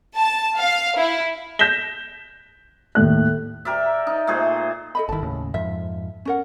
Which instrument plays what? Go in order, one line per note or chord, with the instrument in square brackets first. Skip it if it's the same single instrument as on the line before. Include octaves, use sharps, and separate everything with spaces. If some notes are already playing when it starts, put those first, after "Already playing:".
[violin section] A5
F5
E4
[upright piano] G6 A#6 B6 E7 G7
D#2 A2 F#6
[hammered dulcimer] G4 A#4 D5 E5
D#4
A#2 A3 G#4 C5
[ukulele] A4 D#5 B5
[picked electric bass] G1 D#3 [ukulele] E4 A5
[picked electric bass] D#2 A2 C#3
[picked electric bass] F2 G#2 F3 [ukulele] E5
[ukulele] C#4 A#4 F#5